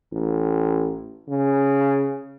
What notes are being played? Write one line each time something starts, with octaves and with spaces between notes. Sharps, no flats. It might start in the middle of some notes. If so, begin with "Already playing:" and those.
A1
C#3